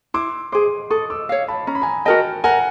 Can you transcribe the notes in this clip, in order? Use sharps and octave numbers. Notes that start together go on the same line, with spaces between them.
E4 C6 D6
G#4 C5 C6 D6
A4 C#6 D#6
D6 E6
C#5 F5
A5 B5
C#4 A#5
B5
G#5 A#5
F#4 A#4 D#5 G5 A5
A#4 F#5 G#5